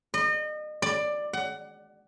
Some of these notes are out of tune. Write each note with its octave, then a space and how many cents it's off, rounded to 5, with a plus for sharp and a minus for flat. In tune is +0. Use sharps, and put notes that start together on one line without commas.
D#5 -35
D5 +15
F#5 +25